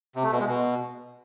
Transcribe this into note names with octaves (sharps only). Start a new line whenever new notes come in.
C3
A3
B2
G#3
B2